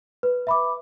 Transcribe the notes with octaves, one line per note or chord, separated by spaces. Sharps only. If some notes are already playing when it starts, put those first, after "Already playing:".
B4
E5 B5 D6